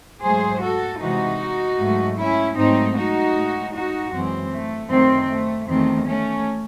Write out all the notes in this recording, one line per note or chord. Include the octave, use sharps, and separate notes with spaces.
G#2 F#3 A3 G#4 C5
F#4 A4
C3 E3 G#3 D#4 F#4
G#2 F#3 A3
C#4 E4
G#2 F#3 A3 C4 D#4
D#4 F#4
A2 G#3
D#4 F#4
F#2 E3 G#3 C4
A3
F#2 D#3 A3 C4
A3
E2 D#3 A3 C4
A3 C#4